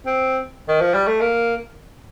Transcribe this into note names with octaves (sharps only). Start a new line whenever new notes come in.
C4
D#3
F3
G3
A3
A#3